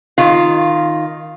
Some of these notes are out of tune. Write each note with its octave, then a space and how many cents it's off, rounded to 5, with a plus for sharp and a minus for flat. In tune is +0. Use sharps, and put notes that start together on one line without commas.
D#3 +0 F4 +0